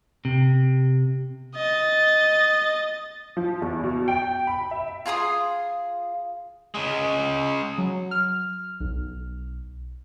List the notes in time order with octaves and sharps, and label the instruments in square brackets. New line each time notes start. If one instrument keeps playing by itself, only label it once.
[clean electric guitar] C3
[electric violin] D#5 A6
[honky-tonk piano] F3
E2
B2
G5
B5
E5
[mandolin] F4 G#4 C6 D#6
[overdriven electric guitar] C#3 G#3
[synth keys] F#3
F6
B1